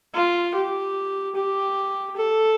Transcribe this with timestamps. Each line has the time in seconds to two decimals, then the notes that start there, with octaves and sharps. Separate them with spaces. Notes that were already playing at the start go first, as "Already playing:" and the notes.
0.14 F4
0.55 G4
1.36 G4
2.17 A4